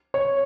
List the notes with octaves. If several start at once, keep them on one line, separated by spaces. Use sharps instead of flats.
C#5